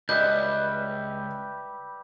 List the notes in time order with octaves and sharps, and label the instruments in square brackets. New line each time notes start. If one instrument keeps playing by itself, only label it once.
[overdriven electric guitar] C#2 [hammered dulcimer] G3 B4 E5 [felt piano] D#5 [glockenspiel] G6